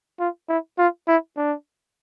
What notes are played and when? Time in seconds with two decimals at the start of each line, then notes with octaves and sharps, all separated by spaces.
0.20 F4
0.49 E4
0.78 F4
1.08 E4
1.37 D4